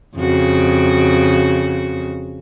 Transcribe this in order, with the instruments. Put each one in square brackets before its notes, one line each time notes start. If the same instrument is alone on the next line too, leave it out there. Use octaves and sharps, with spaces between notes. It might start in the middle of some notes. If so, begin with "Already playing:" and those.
[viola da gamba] F2 C#3 F#4